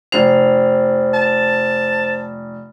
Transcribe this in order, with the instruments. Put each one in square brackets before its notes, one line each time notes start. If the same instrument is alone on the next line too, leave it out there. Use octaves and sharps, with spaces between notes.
[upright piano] F1 F7 [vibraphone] C5
[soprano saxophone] A5